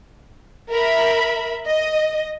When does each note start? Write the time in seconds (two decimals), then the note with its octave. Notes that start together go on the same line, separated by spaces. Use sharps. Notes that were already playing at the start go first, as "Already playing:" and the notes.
0.71 A#4 E5 B5
1.66 D#5